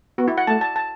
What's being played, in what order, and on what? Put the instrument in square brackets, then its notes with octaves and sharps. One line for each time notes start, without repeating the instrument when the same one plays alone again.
[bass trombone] B3 [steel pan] F#4
[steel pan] E4
F#5
[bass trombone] A3 [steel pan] A5
[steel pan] A5
A5